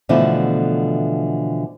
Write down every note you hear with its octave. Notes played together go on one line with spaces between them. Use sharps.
B2 D3 E3 F3 A3 E4